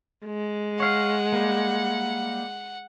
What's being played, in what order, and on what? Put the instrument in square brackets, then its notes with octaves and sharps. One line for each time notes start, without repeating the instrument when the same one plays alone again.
[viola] G#3
[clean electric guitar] C#5 F5 [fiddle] F#5
[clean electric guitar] G3 A#3